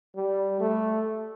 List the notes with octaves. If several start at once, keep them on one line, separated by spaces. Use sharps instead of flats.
G3
A3